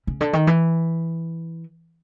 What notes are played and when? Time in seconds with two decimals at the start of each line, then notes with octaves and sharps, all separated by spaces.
0.07 C#3
0.21 D3
0.33 D#3
0.47 E3